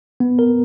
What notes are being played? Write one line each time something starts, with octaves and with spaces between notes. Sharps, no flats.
B3
A#4